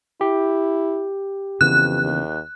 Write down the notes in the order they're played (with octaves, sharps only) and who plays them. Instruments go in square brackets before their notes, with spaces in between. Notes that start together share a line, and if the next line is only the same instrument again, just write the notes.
[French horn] E4 [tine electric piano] G4
[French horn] F2 [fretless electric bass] C#3 E3 B3 [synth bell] F#6
[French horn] D#2